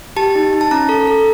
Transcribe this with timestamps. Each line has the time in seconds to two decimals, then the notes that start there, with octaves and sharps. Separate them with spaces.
0.16 G4 A5
0.35 D#4
0.53 D#4
0.61 A5
0.71 C#4 A#5
0.89 A4
1.07 A4